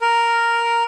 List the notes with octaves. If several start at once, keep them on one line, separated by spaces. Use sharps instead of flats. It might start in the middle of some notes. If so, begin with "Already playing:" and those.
A#4